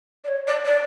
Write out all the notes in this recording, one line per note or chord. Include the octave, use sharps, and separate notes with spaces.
D5
C#5
D5
D5